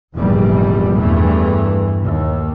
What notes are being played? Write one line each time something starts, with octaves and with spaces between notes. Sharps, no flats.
F1 A#1 E2 G#2 G3
E2 G2 E3 A3
D#2